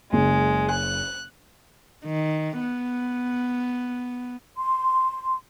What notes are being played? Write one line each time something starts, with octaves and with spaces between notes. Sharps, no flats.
F#1 G#3
F#6
D#3
B3
C6